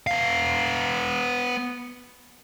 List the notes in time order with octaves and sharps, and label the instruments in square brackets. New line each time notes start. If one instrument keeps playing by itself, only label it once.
[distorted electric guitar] B3 F5